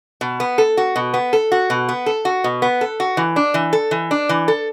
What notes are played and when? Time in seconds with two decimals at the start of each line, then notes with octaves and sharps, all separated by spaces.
0.21 B2
0.40 B3
0.58 A4
0.77 F#4
0.96 B2
1.14 B3
1.33 A4
1.52 F#4
1.70 B2
1.89 B3
2.06 A4
2.25 F#4
2.44 B2
2.62 B3
2.81 A4
3.00 F#4
3.17 E3
3.36 D4
3.54 E3
3.73 A4
3.91 E3
4.11 D4
4.29 E3
4.48 A4